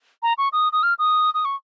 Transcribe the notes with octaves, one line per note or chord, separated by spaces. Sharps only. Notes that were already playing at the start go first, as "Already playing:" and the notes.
A#5
C#6
D#6
D#6
F6
D#6
D#6
C#6